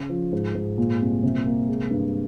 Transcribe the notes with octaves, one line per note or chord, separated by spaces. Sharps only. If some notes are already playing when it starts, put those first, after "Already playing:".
Already playing: C#3
F3
G#2
G#2
A#2
C2
C3
A#3
G#3
G2